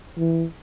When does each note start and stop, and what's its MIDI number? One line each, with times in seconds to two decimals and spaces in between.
0.18 0.45 52